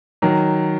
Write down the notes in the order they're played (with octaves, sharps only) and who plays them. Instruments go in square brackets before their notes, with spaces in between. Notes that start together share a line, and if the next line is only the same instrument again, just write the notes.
[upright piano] D#3 F#3